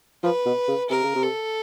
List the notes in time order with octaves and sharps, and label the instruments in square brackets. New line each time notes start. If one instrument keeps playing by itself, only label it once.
[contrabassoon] F3 [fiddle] B4
[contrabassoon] B2
C#3
[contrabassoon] C3 [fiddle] A#4
[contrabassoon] C#3
C3
[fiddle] A4